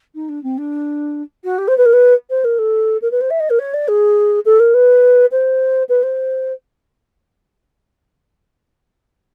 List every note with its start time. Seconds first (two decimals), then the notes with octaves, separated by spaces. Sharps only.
0.15 D#4
0.29 D4
0.43 C4
0.58 D4
1.44 F#4
1.58 G4
1.68 C5
1.78 B4
1.86 A#4
1.93 B4
2.30 C5
2.44 A#4
2.58 A4
3.02 A#4
3.11 B4
3.21 C5
3.30 E5
3.40 D#5
3.50 A#4
3.59 C#5
3.74 D5
3.88 G#4
4.45 A4
4.60 A#4
4.74 B4
5.31 C5
5.89 B4
6.03 C5